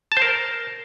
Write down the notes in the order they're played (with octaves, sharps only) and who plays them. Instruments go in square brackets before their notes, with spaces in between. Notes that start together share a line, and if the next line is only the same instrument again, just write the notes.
[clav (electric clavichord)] A5
C5
A#4